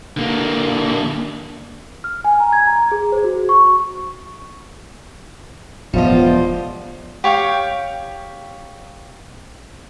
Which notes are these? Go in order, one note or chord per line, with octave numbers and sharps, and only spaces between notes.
D3 A#3
F6
G#5
A#5
G#6
A#5
G#4
C5
F#4
C#6
E1 A2 F3 G3 B3 F4 D#5
G4 C#5 F5 G5